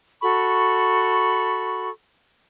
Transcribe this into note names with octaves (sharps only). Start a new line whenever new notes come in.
F#4 A4 B5 C#6